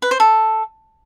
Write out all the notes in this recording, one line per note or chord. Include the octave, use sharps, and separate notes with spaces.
B4
C5
A4